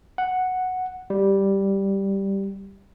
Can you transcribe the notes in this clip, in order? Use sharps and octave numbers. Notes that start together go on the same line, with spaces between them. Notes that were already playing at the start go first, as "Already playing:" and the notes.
F#5
G3